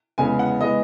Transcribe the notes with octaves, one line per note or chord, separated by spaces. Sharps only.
E2 C#3 G#3 B3 G#5
F#5
E3 G#3 B3 D#5